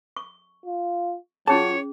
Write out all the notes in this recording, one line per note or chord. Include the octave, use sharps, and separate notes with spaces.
C#6
F4
F#3 C#4 F4 G#4 C#5 A5